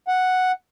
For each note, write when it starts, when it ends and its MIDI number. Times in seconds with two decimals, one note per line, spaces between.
0.08 0.52 78